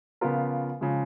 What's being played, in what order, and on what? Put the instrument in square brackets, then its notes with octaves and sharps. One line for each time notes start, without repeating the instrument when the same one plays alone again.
[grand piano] C#3 F3 B3 F4 A#4
C#3 F3 G#3